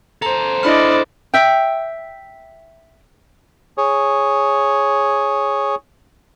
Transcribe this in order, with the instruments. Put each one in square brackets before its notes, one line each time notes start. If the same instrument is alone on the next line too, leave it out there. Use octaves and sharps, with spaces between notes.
[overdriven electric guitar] A4 C5 [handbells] A#5
[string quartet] D4 D5 D#5 [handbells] E4 B5 F6
[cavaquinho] E5 G5
[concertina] G#4 C#5